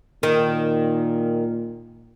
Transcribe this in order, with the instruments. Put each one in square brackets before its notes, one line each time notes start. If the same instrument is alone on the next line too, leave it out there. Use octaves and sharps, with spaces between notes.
[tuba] A#2 [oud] D#3